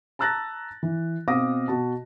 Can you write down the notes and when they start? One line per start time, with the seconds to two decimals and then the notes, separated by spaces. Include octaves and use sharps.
0.19 A5 A#5 E6 F#6 A6 A#6
0.83 E3
1.28 B2 C4 F5 D6 D#6 A#6
1.68 B2 F#4 A5